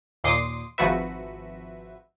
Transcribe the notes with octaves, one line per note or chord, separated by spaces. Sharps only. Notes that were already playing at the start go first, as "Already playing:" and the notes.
D#2 A#2 C6 D6 D#6 C7
G#1 F3 F#4 B4 E5